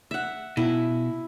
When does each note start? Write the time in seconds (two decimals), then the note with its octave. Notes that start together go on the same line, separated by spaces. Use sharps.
0.11 E5 F#5
0.57 B2 E4